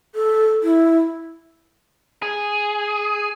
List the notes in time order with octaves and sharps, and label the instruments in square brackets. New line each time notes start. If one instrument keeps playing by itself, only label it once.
[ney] A4
E4
[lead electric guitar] G#4